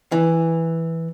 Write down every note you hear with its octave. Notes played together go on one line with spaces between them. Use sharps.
E3